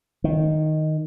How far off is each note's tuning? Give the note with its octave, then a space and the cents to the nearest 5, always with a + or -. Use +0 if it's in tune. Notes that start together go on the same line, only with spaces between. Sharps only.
D#3 +0